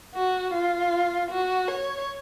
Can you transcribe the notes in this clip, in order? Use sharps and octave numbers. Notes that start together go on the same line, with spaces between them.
F#4
F4
F#4
C#5